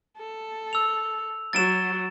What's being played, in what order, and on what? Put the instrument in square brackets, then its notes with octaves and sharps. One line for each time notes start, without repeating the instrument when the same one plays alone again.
[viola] A4
[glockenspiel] E6 F7
[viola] F#3 [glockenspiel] A6 D7 E7